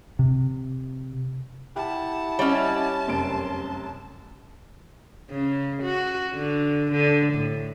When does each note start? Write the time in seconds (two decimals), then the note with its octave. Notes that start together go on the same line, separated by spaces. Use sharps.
0.19 C3
1.76 E4 G4 F#5 A5
2.39 G3 C#4 C#5 D#5 E5
3.07 F1 F#2 C6 D7
5.30 C#3
5.83 F#4
6.35 D3
6.92 D3
7.34 A2